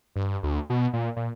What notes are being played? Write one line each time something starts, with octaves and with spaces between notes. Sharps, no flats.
G2
D2
B2
A#2
A#2